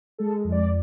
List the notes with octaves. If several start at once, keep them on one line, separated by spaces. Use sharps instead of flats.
G#3 A4
F2
D5